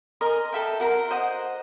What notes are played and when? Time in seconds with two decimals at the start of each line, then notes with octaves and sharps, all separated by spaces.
0.21 A#4 D#5 G#5 C6
0.52 A4 E5 G5
0.80 F#4 A#4 B5 C6
1.11 C5 D#5 F#5